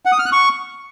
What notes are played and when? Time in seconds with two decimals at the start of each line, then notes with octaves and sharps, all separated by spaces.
0.05 F#5
0.12 D#6
0.19 F6
0.26 F#6
0.32 C#6